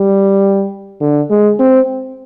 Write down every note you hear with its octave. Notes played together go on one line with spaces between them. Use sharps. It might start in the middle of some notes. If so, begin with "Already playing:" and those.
Already playing: G3
D3
G#3
C4